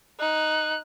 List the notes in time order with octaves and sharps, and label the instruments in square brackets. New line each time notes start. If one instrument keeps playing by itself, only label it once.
[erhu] D#4 [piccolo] F#6